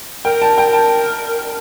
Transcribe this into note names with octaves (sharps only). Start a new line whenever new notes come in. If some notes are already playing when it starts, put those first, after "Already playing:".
A#4 G5
A5
G5
A5